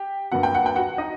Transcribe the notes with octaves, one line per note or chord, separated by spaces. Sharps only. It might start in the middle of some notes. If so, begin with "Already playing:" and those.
Already playing: G4 G5
G2 F#3 A#3 F#5
G5
F#5
G5
F#4 F#5
D#4 D#5